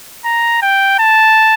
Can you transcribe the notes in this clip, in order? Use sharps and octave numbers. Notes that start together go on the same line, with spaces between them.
A#5
G5
A5